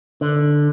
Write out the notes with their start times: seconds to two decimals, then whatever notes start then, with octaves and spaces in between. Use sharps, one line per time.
0.21 D3